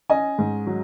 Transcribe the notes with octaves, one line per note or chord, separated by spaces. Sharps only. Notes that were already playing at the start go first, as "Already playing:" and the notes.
C#4 D#5 G#5
G#2
F#3